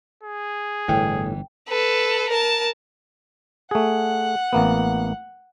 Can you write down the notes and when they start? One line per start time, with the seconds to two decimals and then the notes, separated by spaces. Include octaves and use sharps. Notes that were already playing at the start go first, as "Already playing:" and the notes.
0.23 G#4
0.88 G1 A2 E3 G5
1.68 A4 B4
2.29 A#4 A5
3.71 A3 G#4 F#5
4.53 A1 A#3 B3